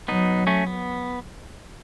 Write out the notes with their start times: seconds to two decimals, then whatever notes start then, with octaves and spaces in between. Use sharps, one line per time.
0.08 F#3 B3 D#4
0.47 A3 C#4
0.67 B3